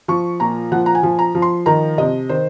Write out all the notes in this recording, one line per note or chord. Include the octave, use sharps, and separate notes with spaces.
F3 C#6
A#2 A#5
F3 F#5
A#5
G#5
F3
A#5
F3
C6
D#3 A#5
C3 D#5
D#3 C5